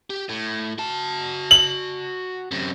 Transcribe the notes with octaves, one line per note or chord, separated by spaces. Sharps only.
G4
A2
F#4 A5
F#7
F#2 C3